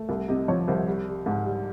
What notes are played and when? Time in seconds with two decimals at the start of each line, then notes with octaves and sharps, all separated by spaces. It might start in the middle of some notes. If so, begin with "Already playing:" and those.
Already playing: A3
0.09 C2
0.28 C3 D#5
0.48 F3 C#5
0.67 C2 C5
0.88 G3
1.07 G3
1.26 G#2
1.46 G3